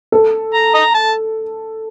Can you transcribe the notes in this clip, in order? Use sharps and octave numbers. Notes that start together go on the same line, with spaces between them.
A4
A#5
D#5 A#5
A5